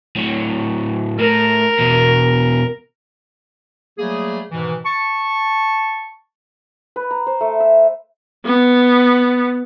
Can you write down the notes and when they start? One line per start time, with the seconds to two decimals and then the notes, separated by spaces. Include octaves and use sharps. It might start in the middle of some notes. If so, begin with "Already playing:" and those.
0.16 A2 F#3
1.20 A2 A#4
1.80 E2 B2
3.99 F#3 G3 A3 A#3 G#4
4.51 G#2 B2 D#3 E3
4.86 A5 C#6
6.96 B4
7.11 A#5
7.27 C5
7.41 A3
7.60 E5
8.45 B3